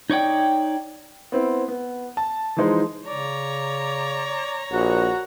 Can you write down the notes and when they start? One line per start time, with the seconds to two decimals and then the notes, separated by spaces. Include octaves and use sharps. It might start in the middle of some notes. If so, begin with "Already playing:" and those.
0.10 D#4 C#5 D5 G5
1.32 B3 C4 E4
1.68 B3
2.17 A5
2.57 E3 F3 G#3 D#4 C5
3.07 C#3 C#5 D5 A#5
4.73 A#1 F#4 F#5